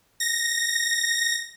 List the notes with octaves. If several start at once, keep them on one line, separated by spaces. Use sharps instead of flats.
A#6